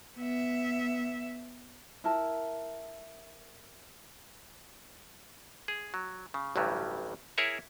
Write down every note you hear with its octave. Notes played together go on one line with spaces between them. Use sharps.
B3 E5
E4 A#4 A5
G#4
F#3
C#3
A1 D2 G2 F#3 G3
E4 G#4 A#4 C#5 E5